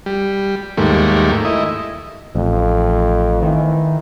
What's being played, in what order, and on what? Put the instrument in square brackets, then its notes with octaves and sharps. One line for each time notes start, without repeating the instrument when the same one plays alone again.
[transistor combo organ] G3
D#2 G#2 G3 A3 A#3
E4 D#5
[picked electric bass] A1 [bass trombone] F2
[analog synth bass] D#3 [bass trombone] E3